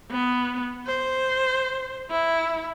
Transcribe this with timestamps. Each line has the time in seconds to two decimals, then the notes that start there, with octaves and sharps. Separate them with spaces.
0.11 B3
0.87 C5
2.10 E4